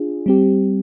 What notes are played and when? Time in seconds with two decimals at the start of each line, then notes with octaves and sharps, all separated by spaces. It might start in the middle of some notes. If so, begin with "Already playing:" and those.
Already playing: D4 F4 G#4
0.26 G3 C4 G4